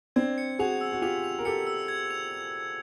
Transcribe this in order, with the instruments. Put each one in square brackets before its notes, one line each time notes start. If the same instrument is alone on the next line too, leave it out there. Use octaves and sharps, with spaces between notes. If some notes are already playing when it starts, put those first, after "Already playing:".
[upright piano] C4 D4 [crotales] G#6
[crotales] C#7
[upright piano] F#4 G#4 [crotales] F7
[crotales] E6
[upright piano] F#4
[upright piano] F4 G4 [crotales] F7
[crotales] F7
[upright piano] A#4
[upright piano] G4 A4 [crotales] C#7
[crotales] E6
G#6
F7